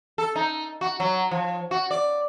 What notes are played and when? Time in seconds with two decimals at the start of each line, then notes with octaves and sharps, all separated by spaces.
0.18 A4
0.36 D#4
0.81 F#4
1.00 F#3
1.31 F3
1.71 F#4
1.91 D5